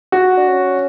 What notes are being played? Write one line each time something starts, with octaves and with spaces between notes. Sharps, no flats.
F#4
D4
C#4